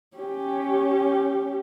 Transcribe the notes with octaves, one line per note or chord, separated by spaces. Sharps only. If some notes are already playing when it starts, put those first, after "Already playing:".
C#4 G4